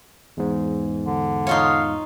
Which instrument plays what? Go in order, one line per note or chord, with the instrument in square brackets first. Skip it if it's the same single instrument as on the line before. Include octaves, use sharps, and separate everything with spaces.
[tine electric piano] E2 G#2
[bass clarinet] D3
[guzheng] D#4 F4 C#5 [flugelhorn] F5